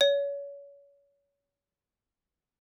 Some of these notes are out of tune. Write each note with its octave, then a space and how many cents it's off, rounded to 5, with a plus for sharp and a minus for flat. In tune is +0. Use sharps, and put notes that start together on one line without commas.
C#5 +30